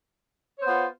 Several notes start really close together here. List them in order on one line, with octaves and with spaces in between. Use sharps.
C#5 C5 B3 F4